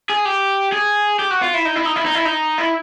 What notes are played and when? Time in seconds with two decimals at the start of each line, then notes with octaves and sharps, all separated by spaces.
0.10 G#4
0.25 G4
0.72 G#4
1.19 G4
1.30 F#4
1.42 F4
1.54 E4
1.65 D#4
1.75 E4
1.86 D#4
1.96 E4
2.05 D#4
2.15 E4
2.26 D#4
2.58 E4